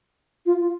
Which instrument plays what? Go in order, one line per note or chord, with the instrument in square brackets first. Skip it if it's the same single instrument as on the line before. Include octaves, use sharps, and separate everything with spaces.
[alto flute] F4